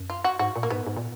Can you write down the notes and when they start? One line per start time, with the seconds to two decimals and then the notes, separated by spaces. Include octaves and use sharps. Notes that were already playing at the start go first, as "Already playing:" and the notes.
Already playing: F#2
0.10 F4
0.24 F#4
0.39 G#2 F#4
0.56 A#2
0.63 A#3
0.70 G#2 B3
0.87 G#2
0.97 A#2